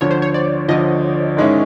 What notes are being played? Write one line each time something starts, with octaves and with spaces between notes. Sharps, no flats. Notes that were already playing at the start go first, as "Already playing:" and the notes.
D2 D3 F3 C#5
C5
C#5
D5
D2 D3 F3 D#5
G#2 D#3 G#3 C#4 E4